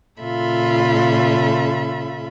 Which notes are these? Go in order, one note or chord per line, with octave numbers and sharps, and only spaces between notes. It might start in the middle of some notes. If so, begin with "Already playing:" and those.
A#2 C#3 F4 A4 E5 B5